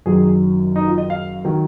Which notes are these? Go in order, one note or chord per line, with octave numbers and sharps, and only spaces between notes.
F#1 F#2 D#3 F#3 G#4
D#4
F4
D#5
F5
D#3 F#3